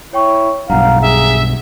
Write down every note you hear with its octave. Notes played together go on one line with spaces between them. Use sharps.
E4 C#5 G5 C#6
B1 G2 F5 F#5 A#5
G#4 E5